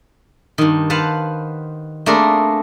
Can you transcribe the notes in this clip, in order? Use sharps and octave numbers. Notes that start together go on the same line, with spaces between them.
G2 D#3
B4 C5 F5 F#5 A5
A3 A#3 C4 D4 G#4 A#4